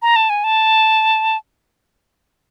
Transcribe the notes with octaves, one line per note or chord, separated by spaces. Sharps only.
A#5
A5
G#5
A5